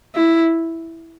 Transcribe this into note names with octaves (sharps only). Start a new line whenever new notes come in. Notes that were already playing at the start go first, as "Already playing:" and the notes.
E4